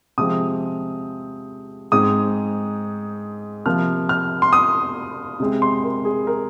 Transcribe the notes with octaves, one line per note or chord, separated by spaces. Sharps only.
C3 F3 G#3 C4 D#6
G#2 G#3 C4 D#6
C3 F3 A#3 F6
F6
C6
D#6
C3 G#3 C4
C6
A#4
G#4
A#4